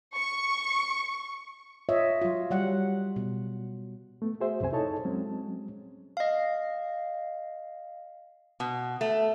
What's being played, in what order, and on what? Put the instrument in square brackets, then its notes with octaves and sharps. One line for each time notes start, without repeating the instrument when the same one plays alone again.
[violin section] C#6
[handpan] F4 C#5 D#5 E5
F#3 F4
F#3 G3 F#5
B2
[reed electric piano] A3 B3
F#4 G#4 C5 E5
C2 F#2 C3 C5 G#5
D#4 E4 A4 C#5 D#5 A5
F#3 G#3 C4 C#4
[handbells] D#5 F5
[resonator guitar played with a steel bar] B2
A3